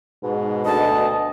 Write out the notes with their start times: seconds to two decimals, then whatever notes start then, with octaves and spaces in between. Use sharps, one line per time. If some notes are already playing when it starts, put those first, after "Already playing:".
0.23 G#2 B2
0.65 D2 D#5 A5